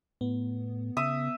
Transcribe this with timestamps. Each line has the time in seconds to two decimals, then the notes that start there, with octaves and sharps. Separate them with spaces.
0.21 A2 B3
0.97 C#3 E5 D#6